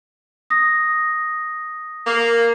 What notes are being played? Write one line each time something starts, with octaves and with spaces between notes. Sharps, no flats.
D#6 A#6
A#3